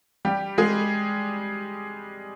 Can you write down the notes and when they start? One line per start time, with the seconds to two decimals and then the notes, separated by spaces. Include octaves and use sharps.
0.25 G3 G4
0.58 G#3 G#4